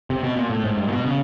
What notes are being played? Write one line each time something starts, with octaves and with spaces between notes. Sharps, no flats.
C3
B2
A#2
A2
G#2
G2
A#2
B2
C#3